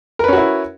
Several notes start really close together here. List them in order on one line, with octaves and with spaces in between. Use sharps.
A#4 B4 C#4 F#4 E4